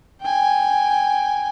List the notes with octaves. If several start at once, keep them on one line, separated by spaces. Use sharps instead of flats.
G5 G#5